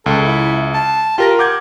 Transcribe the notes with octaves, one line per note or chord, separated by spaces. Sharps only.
C#2 A4
E4
A5
F4 G4 A#4 A#6
F#5 D6 G6 G#6